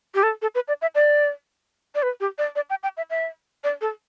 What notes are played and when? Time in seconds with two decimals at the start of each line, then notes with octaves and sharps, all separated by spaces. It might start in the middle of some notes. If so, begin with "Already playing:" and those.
0.15 G4
0.23 A4
0.42 A4
0.55 B4
0.68 D5
0.82 E5
0.95 D5
1.95 D5
2.03 B4
2.20 G4
2.38 D5
2.56 D5
2.70 G5
2.83 G5
2.97 E5
3.10 E5
3.64 D5
3.81 A4